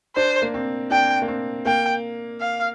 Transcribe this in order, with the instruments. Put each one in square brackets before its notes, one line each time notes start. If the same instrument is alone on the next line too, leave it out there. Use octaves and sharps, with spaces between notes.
[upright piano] D4 [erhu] C5
[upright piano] A#3
C4
[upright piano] D4 [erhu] G5
[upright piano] A#3
C4
[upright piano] A#3 [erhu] G5
[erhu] F5